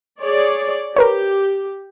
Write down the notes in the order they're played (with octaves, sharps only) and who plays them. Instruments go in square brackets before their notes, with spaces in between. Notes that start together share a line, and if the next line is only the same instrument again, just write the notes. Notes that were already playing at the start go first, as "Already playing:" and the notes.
[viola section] G#4 C#5 D5
[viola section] G4 [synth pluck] A#4 B4 C#5